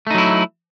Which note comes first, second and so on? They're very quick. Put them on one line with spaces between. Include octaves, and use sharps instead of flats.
A3 D#4 F#3 E4